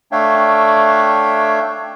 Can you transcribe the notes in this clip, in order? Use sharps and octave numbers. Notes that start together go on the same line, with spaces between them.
A3 D4 C#5 E5 F5 G5